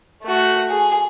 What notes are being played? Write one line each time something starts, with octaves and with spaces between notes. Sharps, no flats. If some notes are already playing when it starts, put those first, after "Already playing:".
A3 F#4
G#4